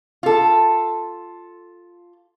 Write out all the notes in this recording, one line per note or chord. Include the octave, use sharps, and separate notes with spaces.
F4 A4